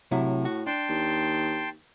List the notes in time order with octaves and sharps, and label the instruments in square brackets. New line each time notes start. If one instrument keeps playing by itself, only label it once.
[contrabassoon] A2 [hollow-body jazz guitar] C3 F#3 E4
[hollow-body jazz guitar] F#4
[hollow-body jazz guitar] D4 [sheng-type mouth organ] G5 A5 C6
[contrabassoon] D#2